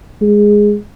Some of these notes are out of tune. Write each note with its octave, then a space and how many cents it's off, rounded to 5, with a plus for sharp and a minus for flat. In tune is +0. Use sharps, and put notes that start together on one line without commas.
G#3 -5